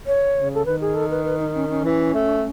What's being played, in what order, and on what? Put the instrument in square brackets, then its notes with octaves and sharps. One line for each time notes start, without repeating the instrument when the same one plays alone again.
[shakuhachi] C#5
[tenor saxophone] C#3
[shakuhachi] A4
[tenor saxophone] D#3 [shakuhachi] B4
[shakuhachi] G#4
A4
B4
B4
D#4
C#4
C#4
[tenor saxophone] E3
A3